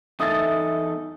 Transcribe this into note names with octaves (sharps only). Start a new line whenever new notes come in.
E2 D#4 A4 E5 D#6 E6 A6